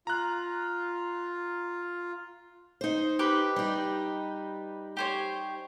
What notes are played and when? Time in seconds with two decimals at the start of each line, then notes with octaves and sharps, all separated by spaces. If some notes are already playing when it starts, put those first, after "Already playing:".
0.07 F4 A#5 F#6
2.81 D#4 C5
3.19 G4 B4
3.56 G3 D#4
4.97 G4 C5 C#5